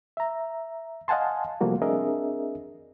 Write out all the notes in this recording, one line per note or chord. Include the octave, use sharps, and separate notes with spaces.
E5 A#5
D#5 F5 F#5 G#5 A5 C6
C3 F3 G3 A3 A#3 F#4
C4 D4 G#4 A#4 D#5 E5